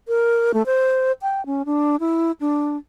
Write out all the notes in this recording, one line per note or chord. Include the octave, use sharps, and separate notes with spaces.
A#4
A3
C5
G5
C#4
D4
E4
D4